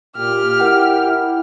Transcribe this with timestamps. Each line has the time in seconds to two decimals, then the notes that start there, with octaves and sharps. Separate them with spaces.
0.17 A#2 G4 F6
0.60 E4 A#4 F#5 G5
1.08 E4